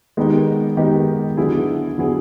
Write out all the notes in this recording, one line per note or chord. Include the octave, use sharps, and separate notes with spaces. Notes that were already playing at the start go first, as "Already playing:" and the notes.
D#3 G#3 B3 D#4 G4
D#3 G#3 B3 D#4 G4
D3 F#3 B3 E4 G#4
D3 F#3 B3 E4 G#4